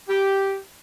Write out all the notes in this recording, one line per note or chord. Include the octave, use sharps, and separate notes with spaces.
G4